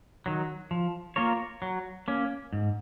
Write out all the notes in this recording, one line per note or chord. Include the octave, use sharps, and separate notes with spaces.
D#3 F#3
F3
A#3 F4 A#4 C#5
F#3
A#3 C#4
G#2